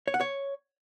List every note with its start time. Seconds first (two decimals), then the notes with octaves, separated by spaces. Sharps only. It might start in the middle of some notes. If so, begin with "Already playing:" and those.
0.08 C#5
0.14 F#5
0.21 C#5